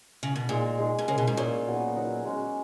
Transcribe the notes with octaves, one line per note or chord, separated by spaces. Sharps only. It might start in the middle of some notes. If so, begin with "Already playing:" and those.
C#3
B2
A#2 G#3 D#4 G#4
G#3 D#4 G#4
B2
C#3 A#3 C#4 G#4 C#5
B2
G#2
A#2 A#3 C#4 G#4 C#5
F#3 B3 D#4 F#4
F#3 B3 D#4 F#4
G#3 C#4 F#4